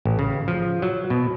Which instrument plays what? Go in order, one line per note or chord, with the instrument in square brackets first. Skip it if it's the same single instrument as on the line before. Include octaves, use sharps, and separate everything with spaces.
[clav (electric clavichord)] A1
C#3
F3
F#3
B2